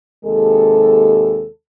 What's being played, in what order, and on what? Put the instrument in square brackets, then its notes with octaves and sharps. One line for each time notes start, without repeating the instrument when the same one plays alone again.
[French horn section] D#2 C3 G#3 A4